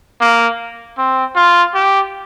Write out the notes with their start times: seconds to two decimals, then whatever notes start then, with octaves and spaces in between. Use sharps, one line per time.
0.21 A#3
0.98 C4
1.36 F4
1.74 G4